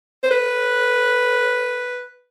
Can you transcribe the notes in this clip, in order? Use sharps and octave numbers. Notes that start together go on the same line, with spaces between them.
C5
B4